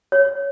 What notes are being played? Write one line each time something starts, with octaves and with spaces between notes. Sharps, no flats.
C#5